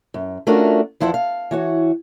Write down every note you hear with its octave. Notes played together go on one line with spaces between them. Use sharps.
F#2
A3 C#4 D4 F4 F#4 A#4
E2 F3 E4 C5 F#5
F5
E3 F#4 C#5